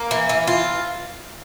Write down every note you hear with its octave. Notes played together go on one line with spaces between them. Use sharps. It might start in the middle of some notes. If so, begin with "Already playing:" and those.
Already playing: A#3
E3
E3
F4